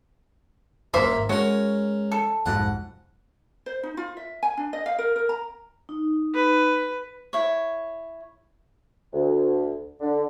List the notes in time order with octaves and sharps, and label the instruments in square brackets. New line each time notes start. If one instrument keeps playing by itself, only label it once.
[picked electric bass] D#1 F#2 [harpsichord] A#3 [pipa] C5 E5
[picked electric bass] G#1
[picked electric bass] G#3 [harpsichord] C#4 A#4 [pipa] F#4
[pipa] A4
[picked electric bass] B1 F2 G#2 [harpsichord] F#5
[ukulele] C5
D#4
F4
E5
G#5
D4
D#5
F5
A#4
A#4
A#5
[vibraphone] D#4
[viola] B4
[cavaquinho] E4 C#5
[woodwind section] D2
D3